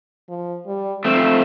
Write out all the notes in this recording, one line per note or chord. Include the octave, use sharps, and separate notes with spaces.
F3
G3
F3 A3 C4